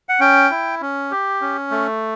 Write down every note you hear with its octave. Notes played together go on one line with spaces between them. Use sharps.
F#5
C#4 G5
E4
C#4
G4
C#4
A3